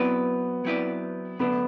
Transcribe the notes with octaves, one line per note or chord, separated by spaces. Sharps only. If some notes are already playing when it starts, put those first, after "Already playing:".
Already playing: F#3 B3 C4 E4 B4 D5
F#3 C4 E4 B4 D5
F#2 D3 A3 B3 D4